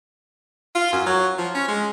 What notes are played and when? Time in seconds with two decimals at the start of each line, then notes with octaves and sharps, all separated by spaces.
0.75 F4
0.93 F#2
1.06 F#3
1.38 F3
1.55 C#4
1.69 G#3